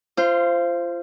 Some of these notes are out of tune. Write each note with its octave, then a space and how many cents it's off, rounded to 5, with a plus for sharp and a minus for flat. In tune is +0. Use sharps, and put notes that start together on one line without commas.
F4 -25 C5 +0